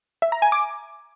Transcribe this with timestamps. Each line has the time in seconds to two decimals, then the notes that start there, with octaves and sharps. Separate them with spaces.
0.22 E5
0.32 A#5
0.42 G#5
0.52 D6